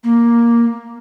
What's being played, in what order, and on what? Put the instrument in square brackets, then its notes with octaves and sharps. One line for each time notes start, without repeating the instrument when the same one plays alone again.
[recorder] A#3